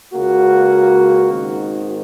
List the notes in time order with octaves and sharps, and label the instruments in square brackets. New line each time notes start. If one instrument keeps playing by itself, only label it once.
[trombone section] C#2 C#3 A#3 F#4
G#1 G#2 D#3